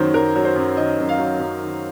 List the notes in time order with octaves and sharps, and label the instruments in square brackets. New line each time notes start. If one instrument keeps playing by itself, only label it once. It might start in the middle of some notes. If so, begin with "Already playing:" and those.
Already playing: [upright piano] F#2 D#3 F#3 C5 C#5
F#2 A#4
F#3
C5
F#2
D#3 D#5
F#2
F5
F#3
F#2
D#3